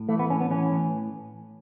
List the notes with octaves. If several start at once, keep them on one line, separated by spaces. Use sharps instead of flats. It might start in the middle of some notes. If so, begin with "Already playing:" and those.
Already playing: A2
E3 A3
B3
A2 C#4
B3
E3 C#4
A2